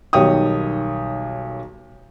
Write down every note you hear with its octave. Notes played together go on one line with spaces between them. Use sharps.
B1 D#3 G3 C#5 G5 D#6